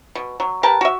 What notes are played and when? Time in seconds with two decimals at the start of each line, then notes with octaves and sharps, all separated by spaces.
0.15 B2
0.40 F#3
0.63 G4 A#4 B4 A5
0.81 F#4 E5